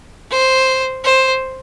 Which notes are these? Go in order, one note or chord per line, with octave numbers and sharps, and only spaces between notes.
C5
C5